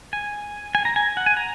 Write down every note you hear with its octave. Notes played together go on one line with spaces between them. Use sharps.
G#5
G#5
A#5
G#5
F#5
G#5
A#5